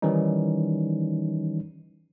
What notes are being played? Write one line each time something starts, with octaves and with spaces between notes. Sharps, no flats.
D#3 E3 G3 C#4 D#4